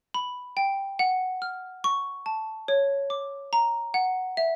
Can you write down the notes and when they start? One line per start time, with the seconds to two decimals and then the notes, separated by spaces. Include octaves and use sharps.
0.14 B5
0.57 G5
0.99 F#5
1.42 F6
1.84 C#6
2.26 A5
2.68 C#5
3.10 D6
3.53 A#5
3.94 F#5
4.37 E5